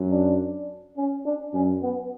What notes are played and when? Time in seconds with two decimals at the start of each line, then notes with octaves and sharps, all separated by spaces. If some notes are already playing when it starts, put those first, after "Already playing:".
Already playing: F#2
0.11 D4
0.97 C#4
1.25 D4
1.54 F#2 C#4
1.82 B3